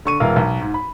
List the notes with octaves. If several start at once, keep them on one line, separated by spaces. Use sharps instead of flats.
D3 C#6 D#7
E1 E3 A#4 F5
B1
G#2
B5